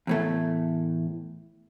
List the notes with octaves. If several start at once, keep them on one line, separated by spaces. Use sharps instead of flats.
E2 A2 A3